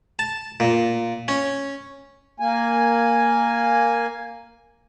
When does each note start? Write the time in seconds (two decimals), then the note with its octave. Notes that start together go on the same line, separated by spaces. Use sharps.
0.19 A5
0.60 A#2
1.28 C#4
2.40 A#3 G#5